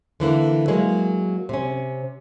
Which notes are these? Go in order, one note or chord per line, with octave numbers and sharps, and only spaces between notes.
D3 E3 A#3
F#3 G#3 A#3
C3 C#4